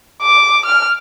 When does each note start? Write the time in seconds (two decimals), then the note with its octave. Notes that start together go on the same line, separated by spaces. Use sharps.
0.22 D6
0.66 F6